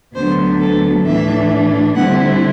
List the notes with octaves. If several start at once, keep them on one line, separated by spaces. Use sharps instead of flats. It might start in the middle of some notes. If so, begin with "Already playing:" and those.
D2 D3 F#3 B3 D4 C5
A4
A2 E3 A3 D4 E5
D3 G3 C4 E4 F#5